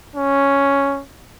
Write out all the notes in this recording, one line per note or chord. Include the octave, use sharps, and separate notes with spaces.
C#4